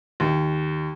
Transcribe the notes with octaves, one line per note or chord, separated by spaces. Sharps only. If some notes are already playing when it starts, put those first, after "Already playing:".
D#2